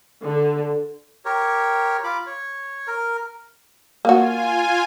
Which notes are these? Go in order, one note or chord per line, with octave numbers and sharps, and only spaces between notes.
D3
G4 A#4 C#5
F4 B5 D6
C#5
A#4
A#3 F4 F#4 G#5